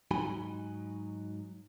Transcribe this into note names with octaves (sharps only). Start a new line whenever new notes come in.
G#2 F#3 D#4 F#4 G#5 B5